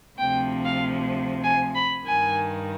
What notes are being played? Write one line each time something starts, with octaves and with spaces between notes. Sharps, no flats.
D2 C3 F3 G5
F5
G#5
B5
G2 D#3 G#5